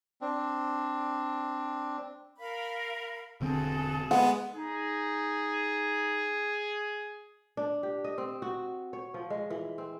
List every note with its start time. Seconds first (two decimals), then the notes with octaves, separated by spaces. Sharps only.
0.21 C4 D4
2.38 A#4 F5 B5
3.41 E1 D3 C4 F#4 G#4 A4
4.11 G#3 B3 F#5
4.53 D#4 G#4
7.57 D4
7.83 G4
8.04 D#5
8.18 C4
8.42 F#4
8.93 C#5
9.14 F3
9.30 G#3
9.50 E3
9.78 C4